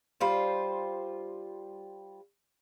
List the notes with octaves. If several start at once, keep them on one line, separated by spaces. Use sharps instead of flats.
G3 F4 C5